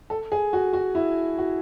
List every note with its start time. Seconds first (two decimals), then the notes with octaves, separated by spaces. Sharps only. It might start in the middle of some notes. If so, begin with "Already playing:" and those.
0.10 A4
0.32 G#4
0.53 F#4
0.73 F#4
0.95 E4
1.38 F#4